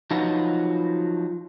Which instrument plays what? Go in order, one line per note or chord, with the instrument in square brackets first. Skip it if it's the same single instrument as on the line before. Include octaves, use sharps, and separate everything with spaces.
[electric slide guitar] F3 F#3 D#4 F4 F#4 B4